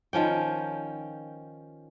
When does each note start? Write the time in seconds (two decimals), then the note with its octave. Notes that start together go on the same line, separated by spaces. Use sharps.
0.13 D#3 F3 C#4 G5